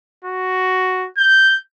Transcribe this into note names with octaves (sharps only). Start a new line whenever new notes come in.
F#4
G6